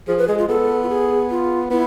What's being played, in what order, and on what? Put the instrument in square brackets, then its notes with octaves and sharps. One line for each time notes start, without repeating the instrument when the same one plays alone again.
[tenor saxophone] F3 [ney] G#4
[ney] B4
[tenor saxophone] G#3 [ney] G#4
[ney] F4
[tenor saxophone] B3 [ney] A4
[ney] F4
G#4
F4
[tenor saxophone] B3 [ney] E4